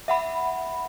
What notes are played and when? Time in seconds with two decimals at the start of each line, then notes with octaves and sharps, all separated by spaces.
0.08 E5 F#5 B5